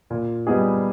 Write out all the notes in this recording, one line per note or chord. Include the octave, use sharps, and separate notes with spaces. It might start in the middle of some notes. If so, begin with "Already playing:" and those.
A#2
G3 B3 D#4 G#4